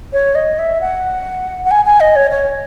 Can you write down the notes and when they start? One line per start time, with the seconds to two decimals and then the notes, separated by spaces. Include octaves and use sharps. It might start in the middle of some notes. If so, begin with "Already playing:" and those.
0.13 C#5
0.35 D#5
0.59 E5
0.81 F#5
1.65 F#5
1.71 G#5
1.86 G#5
2.00 D#5
2.16 C#5
2.31 C#5